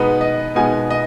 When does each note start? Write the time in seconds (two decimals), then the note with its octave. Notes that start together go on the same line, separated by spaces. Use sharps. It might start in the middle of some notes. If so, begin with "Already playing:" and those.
Already playing: B2 G#3 B3 D#4 B4
0.21 D#5
0.55 B2 G#3 B3 D#4 G#5
0.90 D#5